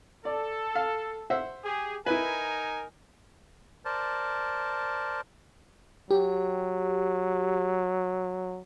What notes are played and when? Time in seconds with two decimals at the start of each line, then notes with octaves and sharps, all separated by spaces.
0.25 A4 D5
0.75 F5
1.30 C5 E5 F#5
1.63 G4 G#4
2.06 D#4 E4 A#4 B4 G#5
3.85 A#4 C5 D5 A5
6.11 F#3 G4